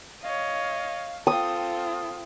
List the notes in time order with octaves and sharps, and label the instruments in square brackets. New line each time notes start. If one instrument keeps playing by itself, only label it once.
[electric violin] C#5 D#5 [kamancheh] F5
[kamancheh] C4 F4 [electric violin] A4 [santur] D#6